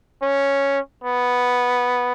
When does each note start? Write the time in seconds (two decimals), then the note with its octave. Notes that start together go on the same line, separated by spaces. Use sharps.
0.22 C#4
1.04 B3